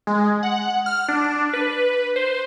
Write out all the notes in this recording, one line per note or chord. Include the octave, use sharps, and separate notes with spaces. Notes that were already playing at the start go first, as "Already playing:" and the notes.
G#3
F#5
F6
D4
B4
C5